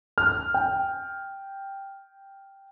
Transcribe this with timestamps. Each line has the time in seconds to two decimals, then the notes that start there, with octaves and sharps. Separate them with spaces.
0.18 F6
0.54 G5